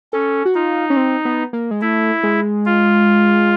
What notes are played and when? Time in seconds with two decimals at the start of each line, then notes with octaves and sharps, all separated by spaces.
0.13 C#4 A4
0.45 F#4
0.55 D#4 F4
0.90 C#4
0.97 C4
1.25 B3
1.53 A#3
1.71 G#3
1.81 A3 E4
2.23 G#3
2.66 F4